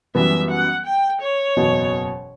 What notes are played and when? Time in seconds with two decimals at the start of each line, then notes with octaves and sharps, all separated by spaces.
0.15 F#2 E3 G3 B3 E5
0.50 F#5
0.86 G5
1.22 C#5
1.56 F#1 E2 B2